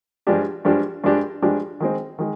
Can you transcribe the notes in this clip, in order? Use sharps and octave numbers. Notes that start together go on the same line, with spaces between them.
G2 F3 G#3 D4 G4
G2 F3 G#3 D4 G4
G2 F3 G#3 D4 G4
G2 F3 G#3 D4 G4
D#3 G#3 C4
D#3 G#3